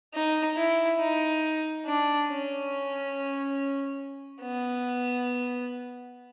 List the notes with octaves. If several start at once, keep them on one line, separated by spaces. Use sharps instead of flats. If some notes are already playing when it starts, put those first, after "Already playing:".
D#4
E4
D#4
D4
C#4
B3